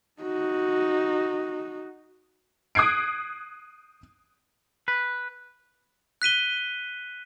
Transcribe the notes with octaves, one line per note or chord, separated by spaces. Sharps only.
D#4 F#4
D#6 F#6 G#6 C7 D7
B4
F#6 B6 D#7 G7